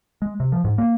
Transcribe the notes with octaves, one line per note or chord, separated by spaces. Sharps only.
G#3
C3
F3
G#2
A#3